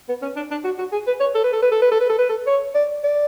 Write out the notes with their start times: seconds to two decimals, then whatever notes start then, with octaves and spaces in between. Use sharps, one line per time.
0.09 B3
0.22 C#4
0.36 D4
0.51 D4
0.64 F#4
0.78 F#4
0.92 G#4
1.07 B4
1.20 C#5
1.35 A4
1.44 B4
1.53 A4
1.62 B4
1.72 A4
1.82 B4
1.92 A4
2.00 B4
2.10 A4
2.19 B4
2.29 A4
2.47 C#5
2.75 D5
3.03 D5